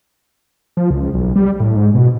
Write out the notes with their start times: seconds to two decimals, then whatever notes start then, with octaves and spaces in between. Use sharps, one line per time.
0.77 F3
0.90 C#2
1.14 B1
1.36 G3
1.60 A2
1.76 G#2
1.95 B2